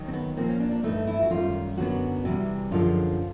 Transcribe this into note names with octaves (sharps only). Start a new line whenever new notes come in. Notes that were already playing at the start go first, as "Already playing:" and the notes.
Already playing: D#2 D#3 F#3
C4
B3
A#2 F3 A#3 C4
C#4
D4
D4
G2 E3 A3 D#4
E4
F#4
F#2 D#3 G3 F4
F#2 D3 F#3 B3 F#4
C3 E3 G3
F#2 D3 F3 G#3 F4